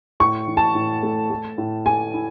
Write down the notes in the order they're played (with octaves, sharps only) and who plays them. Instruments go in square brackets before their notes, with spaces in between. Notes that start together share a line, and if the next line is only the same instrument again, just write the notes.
[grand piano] A2 [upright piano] C#6
[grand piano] E3
[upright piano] A5
[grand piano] A2
A3
A3
A2
[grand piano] A3 [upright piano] G#5
[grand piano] E4